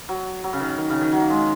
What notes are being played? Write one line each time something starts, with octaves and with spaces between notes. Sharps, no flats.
F#3
F#3
C#3
D#3
D#3
C#3
D#3
F#3
A#3
G#3